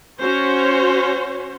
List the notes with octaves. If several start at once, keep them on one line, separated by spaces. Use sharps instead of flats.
C#4 F#4 C5 C#5